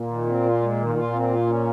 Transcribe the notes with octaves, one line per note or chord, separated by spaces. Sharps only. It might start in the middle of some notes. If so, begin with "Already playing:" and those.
Already playing: A#2
D#3
C4
F4
G#3
D#3
A#2 F4
C4
F4
C#4